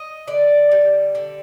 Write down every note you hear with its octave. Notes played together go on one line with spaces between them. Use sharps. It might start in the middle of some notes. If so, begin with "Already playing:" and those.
Already playing: D#5
D3 D5
G3
D3